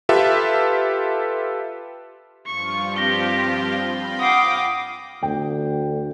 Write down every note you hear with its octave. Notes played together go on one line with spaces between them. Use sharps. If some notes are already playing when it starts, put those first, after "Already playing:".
F4 G4 A4 B4 E5
G2 F3 F4 C#6
C4 G4 A#6 G7
F5 G5 B5
F#5 D6 D#6 C7 G7
D2 G5